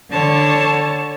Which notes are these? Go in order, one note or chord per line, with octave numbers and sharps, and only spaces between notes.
D3 C#5 A5